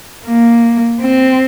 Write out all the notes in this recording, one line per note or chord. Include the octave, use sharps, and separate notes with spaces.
A#3
C4